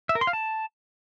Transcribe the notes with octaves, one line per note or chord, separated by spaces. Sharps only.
E5
A#4
C6
F5
A5